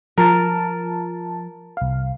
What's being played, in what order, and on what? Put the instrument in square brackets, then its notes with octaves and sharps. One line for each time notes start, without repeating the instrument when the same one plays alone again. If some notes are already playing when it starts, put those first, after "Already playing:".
[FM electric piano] F3 A5 [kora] A#4
[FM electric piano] C2 F5